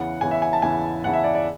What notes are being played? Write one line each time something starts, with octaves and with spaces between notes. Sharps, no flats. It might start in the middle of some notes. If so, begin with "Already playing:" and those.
Already playing: E2 C#3 E3 F#5
E2 C#3 E3 G#5
E5
G#5
A5
E2 C#3 E3 G#5
E2 C#3 E3 F#5
E5
D5
D5